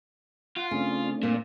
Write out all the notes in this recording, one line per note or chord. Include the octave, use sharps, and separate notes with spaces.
F4 F#5
C#3 A3 C4 D4
A#2 A#3